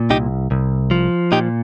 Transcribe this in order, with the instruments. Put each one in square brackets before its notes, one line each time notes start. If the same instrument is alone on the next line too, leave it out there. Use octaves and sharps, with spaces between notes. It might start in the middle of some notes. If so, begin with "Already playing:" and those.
Already playing: [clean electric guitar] A#2
C2 D#4 G4
C2
F3
A#2 D#4 G4